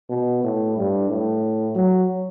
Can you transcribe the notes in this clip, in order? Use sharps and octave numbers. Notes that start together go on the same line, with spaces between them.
B2
A2
G2
A2
F#3